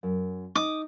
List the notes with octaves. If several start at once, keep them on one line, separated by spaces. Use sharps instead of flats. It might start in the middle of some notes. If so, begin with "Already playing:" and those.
F#2
D#4 D6 D#6